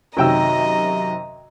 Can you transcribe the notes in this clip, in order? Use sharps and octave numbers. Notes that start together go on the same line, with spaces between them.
F#2 C3 D#3 F#3 D#5 G5 A#5 E6